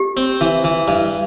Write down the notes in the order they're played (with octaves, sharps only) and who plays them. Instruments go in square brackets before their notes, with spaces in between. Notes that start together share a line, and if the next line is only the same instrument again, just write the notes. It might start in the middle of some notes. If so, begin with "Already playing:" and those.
Already playing: [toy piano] G4
[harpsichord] C4
E3
E3
G2